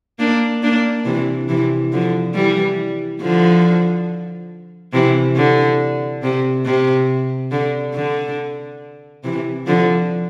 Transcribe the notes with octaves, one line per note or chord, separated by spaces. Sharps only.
A#3 D4
A#3 D4
C3 E3
C3 E3
D3 F3
E3 G3
D3 F3
C3 E3
D3
C3
C3
D3
D3
C3 E3
D3 F3